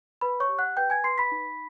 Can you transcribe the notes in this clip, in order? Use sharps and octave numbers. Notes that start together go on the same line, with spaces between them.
B4 B5
C#5 C#6
G4
F#5 F#6
B4 G5 G6
G#5 G#6
B4 C6 C7
B5 B6
D#4